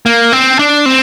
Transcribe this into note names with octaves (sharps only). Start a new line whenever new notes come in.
A#3
C4
D4
C4